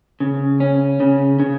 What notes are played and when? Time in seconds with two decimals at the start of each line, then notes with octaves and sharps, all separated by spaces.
0.20 C#3
0.60 C#4
1.00 C#3
1.40 C#3